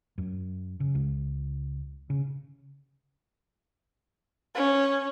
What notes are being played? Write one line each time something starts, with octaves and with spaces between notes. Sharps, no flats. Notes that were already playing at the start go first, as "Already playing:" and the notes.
F#2
C#3
C#2
C#3
C#4